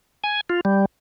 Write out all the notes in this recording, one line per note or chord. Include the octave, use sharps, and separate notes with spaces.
G#5
F4
G3